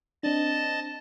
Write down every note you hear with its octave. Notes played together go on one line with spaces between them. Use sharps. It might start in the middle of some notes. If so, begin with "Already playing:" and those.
C4 D4 D#5 A5 A6